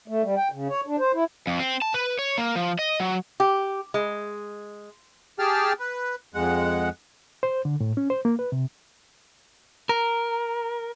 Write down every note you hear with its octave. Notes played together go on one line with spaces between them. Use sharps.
A3
G3
G5
C#3
C#5
D4
C5
E4
F2
C4
A5
B4
C#5
A#3
F3
D#5
F#3
G4
G#3
G4 G#4 G5 A5 F6
B4
F2 G#3 F#5
C5
D3
A2
C#4
C5
A#3
B4
C3
A#4